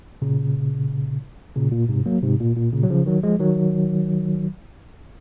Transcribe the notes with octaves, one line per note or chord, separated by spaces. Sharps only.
A#2 C#3
A#2 C#3
A#2
G#2 C3
F#3 A#3
G#2 C3
A#2
A#2
A#2 C#3
F#3
C#3 F3
D#3 F#3
F3 G#3
D#3 F#3